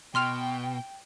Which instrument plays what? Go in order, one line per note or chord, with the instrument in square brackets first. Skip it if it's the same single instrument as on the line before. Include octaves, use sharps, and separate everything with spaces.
[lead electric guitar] B2 [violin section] G5 [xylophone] C6 F6 F7